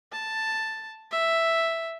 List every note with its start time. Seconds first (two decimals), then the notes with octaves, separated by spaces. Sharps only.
0.12 A5
1.11 E5